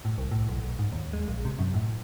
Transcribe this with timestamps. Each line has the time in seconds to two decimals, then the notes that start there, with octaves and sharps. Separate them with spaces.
0.05 A2
0.18 C2
0.31 A2
0.49 B1
0.64 B1
0.79 G#2
0.92 D#2
1.13 G#3
1.28 A#1
1.45 C3
1.59 F#2
1.74 A2